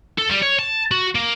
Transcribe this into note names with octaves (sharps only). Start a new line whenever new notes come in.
A4
G3
C#5
A5
F#4
A#3